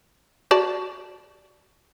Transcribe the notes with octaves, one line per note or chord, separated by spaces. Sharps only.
F#4 D5 A5